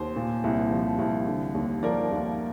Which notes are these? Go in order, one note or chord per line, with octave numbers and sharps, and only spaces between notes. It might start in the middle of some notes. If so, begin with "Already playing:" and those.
Already playing: D#2 C5
A#2
C2
F3
C2
D3
D#2
F3 A#4 D5
D#2